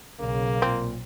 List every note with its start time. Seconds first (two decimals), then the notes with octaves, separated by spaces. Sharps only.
0.20 B1 C#3 A#3
0.62 A#2 C4